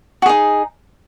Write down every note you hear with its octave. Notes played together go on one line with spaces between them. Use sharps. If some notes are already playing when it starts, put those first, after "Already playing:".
D#4 F#4 G#4